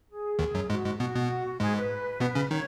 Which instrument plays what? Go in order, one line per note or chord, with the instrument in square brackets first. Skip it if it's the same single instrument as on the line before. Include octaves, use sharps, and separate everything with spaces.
[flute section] G#4
[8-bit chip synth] D#2 D#3
F#2 F#3
[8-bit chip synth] G#2 G#3 [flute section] F#4
[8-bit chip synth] G#2 G#3
[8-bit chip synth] B2 B3 [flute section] F#4
[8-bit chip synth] B2 B3
[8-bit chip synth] G#2 G#3 [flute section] G#4
[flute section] B4
[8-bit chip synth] B2 B3
C#3 C#4
[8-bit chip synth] D#3 D#4 [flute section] C#5